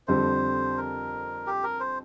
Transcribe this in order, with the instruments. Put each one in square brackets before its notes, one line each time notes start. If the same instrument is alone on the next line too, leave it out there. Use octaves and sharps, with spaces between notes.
[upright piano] F2 D3 G3 C4 [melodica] C5
[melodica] A#4
G4
A#4
C5